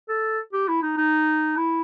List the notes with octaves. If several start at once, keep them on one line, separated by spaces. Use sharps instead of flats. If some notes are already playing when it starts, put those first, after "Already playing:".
A4
G4
E4
D#4
D#4
E4